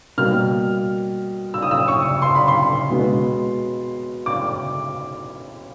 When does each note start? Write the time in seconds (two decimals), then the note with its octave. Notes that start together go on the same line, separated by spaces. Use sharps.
0.17 B2 G3 A#3 F6
1.54 E6
1.62 D#6
1.71 E6
1.88 C#6
2.22 C6
2.35 B5
2.48 C6
2.90 B2 G#3 B3
4.26 D6